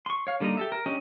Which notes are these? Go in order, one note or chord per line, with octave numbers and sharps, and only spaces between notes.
C6 C#6
C#5 F5
D3 G3 A#3 D#4 A#5
G4 A4 E5
A#4
F#3 C#4 D4 G4 D#5